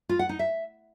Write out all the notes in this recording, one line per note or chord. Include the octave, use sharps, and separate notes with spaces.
F4
F#5
D#4
E5